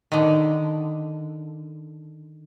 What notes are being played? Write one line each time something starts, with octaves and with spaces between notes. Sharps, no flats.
D3 D#3